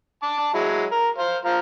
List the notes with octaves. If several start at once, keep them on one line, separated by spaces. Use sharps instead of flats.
A5 D6
F#3 G#3 E4
A#4
C5 F5
F3 F5 A#5